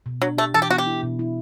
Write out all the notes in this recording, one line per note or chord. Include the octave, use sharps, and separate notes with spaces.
B2
F#3 D4
A3 G4
E3 A4
G4
B3 F#4
G4
E4
B2
E4